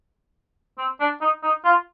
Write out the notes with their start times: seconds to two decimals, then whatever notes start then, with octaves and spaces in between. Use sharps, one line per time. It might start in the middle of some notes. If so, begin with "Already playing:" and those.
0.78 C4
1.00 D4
1.21 D#4
1.43 D#4
1.65 F4